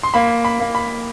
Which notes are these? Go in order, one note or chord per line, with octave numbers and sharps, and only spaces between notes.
C6
A#3 B5
B5
A#3
B5